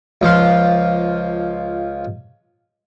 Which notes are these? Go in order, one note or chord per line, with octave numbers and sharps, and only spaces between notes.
C#2 F3 F5 C6